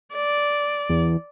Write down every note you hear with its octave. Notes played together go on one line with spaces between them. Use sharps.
D5
E2